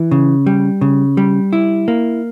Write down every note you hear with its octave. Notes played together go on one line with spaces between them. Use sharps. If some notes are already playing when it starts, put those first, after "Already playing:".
Already playing: E3
C#3
G3
C#3
G3
E4
A#3